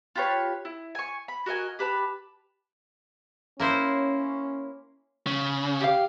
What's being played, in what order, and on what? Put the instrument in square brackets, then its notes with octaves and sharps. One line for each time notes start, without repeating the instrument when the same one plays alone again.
[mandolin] F4 G4 B4 C#5
E4
G#5 C#6
B5
F#4 A#4 D#5 G#5
G4 B4 A5 B5
[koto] A#3 E4 C5 [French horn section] C#4
[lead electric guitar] C#3
[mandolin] G4 F5